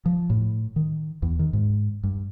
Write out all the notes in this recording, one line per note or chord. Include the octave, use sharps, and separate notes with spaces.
F3
A2
D#3
E2
D#3
G#2
G2